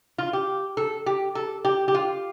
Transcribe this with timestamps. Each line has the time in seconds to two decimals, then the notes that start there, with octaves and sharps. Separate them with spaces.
0.18 F4
0.33 G4
0.77 A4
1.06 G4
1.35 A4
1.65 G4
1.88 G4
1.94 F4